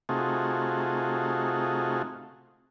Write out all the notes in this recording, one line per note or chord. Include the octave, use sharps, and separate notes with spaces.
C3 A3 D#4 F4 F#4 G#4